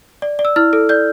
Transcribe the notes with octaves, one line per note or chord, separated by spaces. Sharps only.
D5
D5
E6
E4 F6
A4
D5 G6